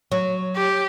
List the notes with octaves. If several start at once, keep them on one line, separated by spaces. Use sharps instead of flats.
F#3
G4